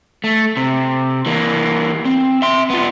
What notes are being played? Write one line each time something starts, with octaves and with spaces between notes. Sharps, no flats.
A3
C3
E3 A#3
C4
E5 C6
B3 F4